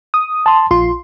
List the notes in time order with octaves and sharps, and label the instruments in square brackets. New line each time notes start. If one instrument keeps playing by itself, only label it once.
[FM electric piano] D#6
[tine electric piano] A5 C6
[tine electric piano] A#1 [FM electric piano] F4 C6